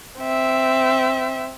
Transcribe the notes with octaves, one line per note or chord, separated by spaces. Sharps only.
C4 E5